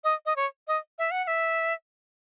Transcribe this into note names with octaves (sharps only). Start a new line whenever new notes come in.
D#5
D#5
C#5
D#5
E5
F#5
F#5
E5